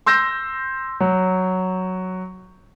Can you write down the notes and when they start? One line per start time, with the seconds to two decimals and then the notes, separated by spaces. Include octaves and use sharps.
0.06 C6 E6 G6 A#6
1.00 F#3